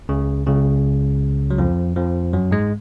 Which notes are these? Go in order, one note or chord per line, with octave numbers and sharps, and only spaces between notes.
C#2 C#3
C#2 C#3
F#3
F2 F3
F2 F3
F#2 F#3
G#2 G#3